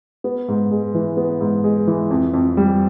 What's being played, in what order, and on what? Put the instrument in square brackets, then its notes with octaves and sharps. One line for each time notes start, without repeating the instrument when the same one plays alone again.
[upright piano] B3
G#2
G#3
E3
B3
G#2
G#3
E3
F2
F2
G3